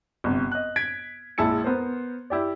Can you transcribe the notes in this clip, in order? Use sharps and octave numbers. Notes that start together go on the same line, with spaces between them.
G1 C3
D#5 F#6
G#6 B6 D7
A#1 G#3 E4 A5 C#7
B3 A#4 C5
E4 G4 D5